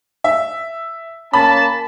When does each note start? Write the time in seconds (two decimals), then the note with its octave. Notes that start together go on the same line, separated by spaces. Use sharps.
0.24 E5
1.34 A#3 C#4 A5 B5